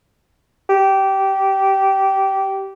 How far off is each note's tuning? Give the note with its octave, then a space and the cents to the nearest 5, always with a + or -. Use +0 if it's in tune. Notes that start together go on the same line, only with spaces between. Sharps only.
G4 -15